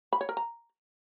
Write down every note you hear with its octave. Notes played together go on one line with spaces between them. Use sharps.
B5
C#5
A#4
A#5